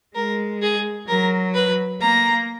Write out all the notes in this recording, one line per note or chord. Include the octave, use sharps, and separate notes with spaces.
G#3 A#4
G#4
F#3 A#4
B4
A#3 A#5